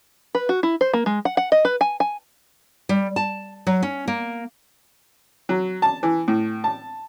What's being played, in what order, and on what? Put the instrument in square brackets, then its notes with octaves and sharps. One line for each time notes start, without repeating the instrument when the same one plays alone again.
[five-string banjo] B4
F#4
E4
C5
A#3
G#3
F#5
F#5
D#5
B4
G#5
G#5
[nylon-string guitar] G3
A5
F#3
C#4
A#3
[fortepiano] F#3
A5
E3
A2
A5